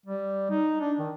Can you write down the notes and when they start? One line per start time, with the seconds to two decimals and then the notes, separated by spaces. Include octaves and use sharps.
0.06 G3
0.50 D#4
0.80 D4
1.00 D#3